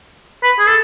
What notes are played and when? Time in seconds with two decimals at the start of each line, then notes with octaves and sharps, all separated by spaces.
0.43 B4
0.59 G#4
0.68 A4